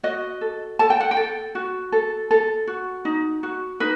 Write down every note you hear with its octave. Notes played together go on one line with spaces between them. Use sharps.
F#4 D#5
A4
A4 A5
G5
F#5
G5
A4
F#4
A4
A4
F#4
D#4
F#4
D#4 B4